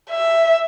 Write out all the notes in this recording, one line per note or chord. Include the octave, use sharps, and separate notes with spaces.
E5